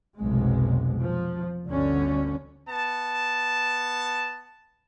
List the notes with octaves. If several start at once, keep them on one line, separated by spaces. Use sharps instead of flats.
F1 B1 C3 G#3
F3
G1 D2 D3 C#4
B3 A5